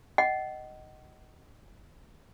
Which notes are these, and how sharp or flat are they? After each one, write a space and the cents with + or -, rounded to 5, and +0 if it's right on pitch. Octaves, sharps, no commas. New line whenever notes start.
D#5 +0 F#5 +40